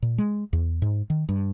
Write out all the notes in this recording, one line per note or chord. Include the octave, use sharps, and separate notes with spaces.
A#2
G#3
E2
G#2
D#3
G2